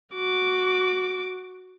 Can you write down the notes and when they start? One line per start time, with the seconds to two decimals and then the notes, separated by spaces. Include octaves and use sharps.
0.15 F#4 D6